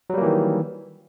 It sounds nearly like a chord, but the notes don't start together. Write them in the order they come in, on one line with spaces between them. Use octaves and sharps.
F#3 G3 A#3 E3 D#3